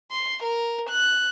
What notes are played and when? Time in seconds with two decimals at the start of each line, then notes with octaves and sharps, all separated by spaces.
0.11 C6
0.43 A#4
0.89 F#6